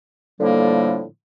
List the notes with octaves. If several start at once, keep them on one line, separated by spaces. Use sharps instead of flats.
A2 D3 F3 G3 A#3